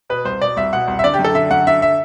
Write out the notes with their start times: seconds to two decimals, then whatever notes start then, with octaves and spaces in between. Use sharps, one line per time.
0.10 B2 B4
0.25 C2 C5
0.41 B2 D5
0.57 C2 E5
0.73 B2 F#5
0.88 C2
0.99 E5
1.04 D3 D5
1.14 G4
1.19 F#2
1.24 A4
1.34 D3 E5
1.51 F#2 F#5
1.67 D3 E5
1.82 E5